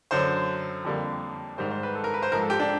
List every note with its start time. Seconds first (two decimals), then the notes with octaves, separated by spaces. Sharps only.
0.11 F#2 D3 F#3 C5
0.85 F2 D3 G3 A#3
1.58 G#2 D#3 G3 C5
1.71 C5
1.83 B4
1.95 A4
2.04 A#4
2.14 B4
2.22 C5
2.32 G#2 F3 G#3 A#4
2.41 A4
2.50 G4
2.60 D4